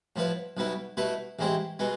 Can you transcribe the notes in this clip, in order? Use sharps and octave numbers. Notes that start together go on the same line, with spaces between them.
A2 F3 B3 E4
B1 B2 B3 E4
B2 A3 E4 B4
A1 A2 G#3 C4 E4
B2 G#3 B3